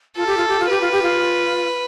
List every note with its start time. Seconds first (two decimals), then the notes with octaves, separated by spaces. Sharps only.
0.16 F4 A4
0.27 G4
0.37 F4
0.48 G4
0.60 F4
0.70 G4 B4
0.81 F4
0.92 G4
1.02 F4